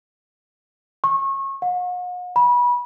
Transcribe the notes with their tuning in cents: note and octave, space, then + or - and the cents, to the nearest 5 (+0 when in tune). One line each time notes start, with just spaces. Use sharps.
C#6 -30
F#5 -45
B5 -25